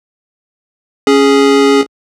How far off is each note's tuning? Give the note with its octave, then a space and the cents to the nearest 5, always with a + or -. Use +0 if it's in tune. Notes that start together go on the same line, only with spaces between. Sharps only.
C#4 +0 G#4 +0